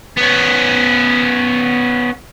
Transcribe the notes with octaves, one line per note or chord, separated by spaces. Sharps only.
B3 C#4